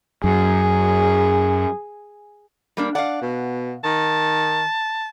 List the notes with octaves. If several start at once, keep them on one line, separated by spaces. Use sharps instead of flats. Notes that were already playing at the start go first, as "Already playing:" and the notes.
F#2 G#4
G3 A#3 D4
D4 F5 F#5
B2
D#3 A5